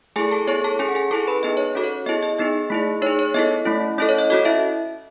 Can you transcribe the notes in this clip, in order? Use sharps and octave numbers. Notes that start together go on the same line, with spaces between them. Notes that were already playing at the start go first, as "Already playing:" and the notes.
A3 E4 G#4 A4 G#5
A4 A5
B3 E4 G#4 C#5 C#6
A4 A5
C#4 G#4 G#5
F#5
G#4 G#5
C#4 E4 G#4 A4 A5
B4 B5
B3 D#4 G#4 D#5
C#5
C#4 F#4 A4
C#5
B3 E4 G#4 D#5
D#5
B3 D#4 G#4 D#5
A3 E4 G#4
D#4 G#4 C#5
C#5
B3 E4 A4 D#5
A3 C#4 E4
C#4 E4 A4 D#5
C#5
D#5
C#4 F#4 A4 D#5
E4 E5